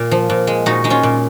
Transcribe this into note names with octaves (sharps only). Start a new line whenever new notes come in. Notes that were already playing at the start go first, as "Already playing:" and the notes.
Already playing: A#2
F3
A#2
G#3
A#2 D#4 F#4
G#3 D#4
C#4 F4
A#2